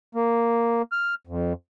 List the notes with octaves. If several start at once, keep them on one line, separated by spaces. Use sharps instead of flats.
A#3
F6
F2